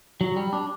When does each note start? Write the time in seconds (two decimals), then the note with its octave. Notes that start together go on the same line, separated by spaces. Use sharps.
0.21 F#3
0.36 G3
0.53 D4